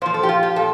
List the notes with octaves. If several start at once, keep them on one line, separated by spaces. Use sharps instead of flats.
A#2 F3 C5
A4
G4
F4
G4
A#2 A4